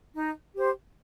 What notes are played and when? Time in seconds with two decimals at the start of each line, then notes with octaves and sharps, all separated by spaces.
0.15 D#4
0.55 G4 C5